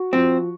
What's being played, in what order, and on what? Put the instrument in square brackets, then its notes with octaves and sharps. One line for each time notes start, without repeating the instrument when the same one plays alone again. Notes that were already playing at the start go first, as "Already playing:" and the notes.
Already playing: [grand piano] F#4
[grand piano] F3 [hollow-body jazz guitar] C4